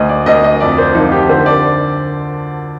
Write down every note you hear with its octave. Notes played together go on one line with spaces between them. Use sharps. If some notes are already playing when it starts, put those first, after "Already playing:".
Already playing: D2 D#5
D5
D2 D#5
D#5
F2 D5
C5
F3 D#4
G4
D3 C5
D5